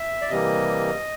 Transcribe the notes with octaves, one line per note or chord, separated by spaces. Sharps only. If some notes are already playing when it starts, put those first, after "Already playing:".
Already playing: E5
D5
C3 E3 G3 A#3 D#5